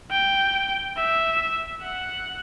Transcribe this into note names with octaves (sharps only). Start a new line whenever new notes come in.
G5
E5
F#5